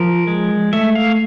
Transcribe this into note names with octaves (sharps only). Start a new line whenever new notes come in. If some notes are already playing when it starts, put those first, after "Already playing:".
Already playing: F3 A#4
G#3
A3 E5
F5